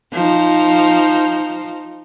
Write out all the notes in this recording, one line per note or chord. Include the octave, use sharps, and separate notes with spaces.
F3 D#4